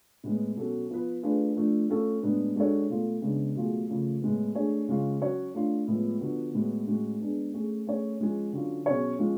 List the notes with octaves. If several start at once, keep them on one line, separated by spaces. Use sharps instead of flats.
A2 G#3 B3
B2 F#3 C#4 F#4 A4
F3 B3 F4 B4
A3 D4 F4 G#4 B4
F3 A3 D4
A3 C#4 F4 A4
A2 G#3 B3 D4 G#4
G#3 D4 F#4 A4 C#5
B2 A3 F4 A4
C#3 G#3 B3 D4
B2 F#3 A3 F4 G#4
C#3 F3 A3 F4
A2 G#3 B3
A3 D4 G#4 C#5
C#3 G#3 C#4 F4
F#3 C#4 F#4 C#5
A3 D4 F4
A2 F3 G#3 B3
D3 F3 B3 F#4
A2 G#3 B3 F#4 B4
A2 G#3 C#4 F#4
G#3 B3 D4 G#4
A3 C#4 G#4
A3 C#4 G#4 C#5
F3 G#3 C#4 G#4
D3 F#3 C#4 F4
B2 F#3 C#4 G#4 C#5
F3 G#3 C#4 F4